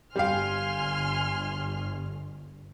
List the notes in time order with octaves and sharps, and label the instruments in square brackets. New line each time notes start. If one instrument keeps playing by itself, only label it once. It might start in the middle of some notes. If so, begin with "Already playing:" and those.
[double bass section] G1 [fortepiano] G3 G4 F5 [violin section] G#5 C6 F6